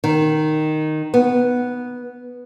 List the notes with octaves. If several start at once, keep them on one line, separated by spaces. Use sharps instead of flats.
D#3
B3